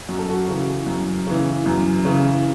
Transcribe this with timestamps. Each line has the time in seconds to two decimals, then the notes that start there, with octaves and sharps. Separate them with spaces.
0.09 F#2 F#4
0.19 A4
0.30 F#4
0.48 C#3 E3
0.87 F#2
1.27 C#3 E3
1.66 F#2
2.05 C#3 E3